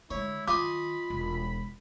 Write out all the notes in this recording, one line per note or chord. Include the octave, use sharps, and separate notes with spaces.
D3 G#3 E4 C#5
D#3 F4 D#5 G#5 B5 D6
E1